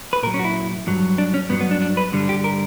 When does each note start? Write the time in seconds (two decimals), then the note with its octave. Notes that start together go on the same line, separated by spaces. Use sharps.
0.13 B4
0.23 A#2 A#4
0.27 F#3
0.34 C#4
0.39 F#4
0.45 E4
0.87 G2 F#3
1.18 D4
1.34 C#4
1.49 G2 F#3 B3
1.61 B3
1.71 D4
1.82 D4
1.97 B4
2.12 G2 D3 G3
2.29 G4
2.44 A#4